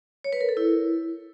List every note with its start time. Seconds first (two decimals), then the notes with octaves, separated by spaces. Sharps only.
0.24 C#5
0.33 B4
0.41 A#4
0.49 A4
0.57 E4